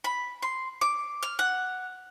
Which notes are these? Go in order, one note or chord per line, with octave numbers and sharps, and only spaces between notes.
B5
C6
D6
F6
F#5